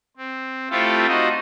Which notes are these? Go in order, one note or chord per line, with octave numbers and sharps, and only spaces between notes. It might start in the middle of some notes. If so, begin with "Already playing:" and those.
C4
A3 C4 E4 F4 G4 A4
D#4 F#4 C5 D#5